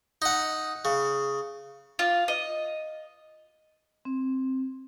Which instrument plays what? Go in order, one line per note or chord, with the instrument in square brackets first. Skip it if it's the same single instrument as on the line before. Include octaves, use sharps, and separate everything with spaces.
[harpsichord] D#4 F#5
C#3
[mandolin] F4
D#5
[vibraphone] C4